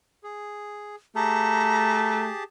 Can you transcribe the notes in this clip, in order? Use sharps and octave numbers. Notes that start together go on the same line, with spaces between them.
G#4
A3 G4 G#4 A5 A#5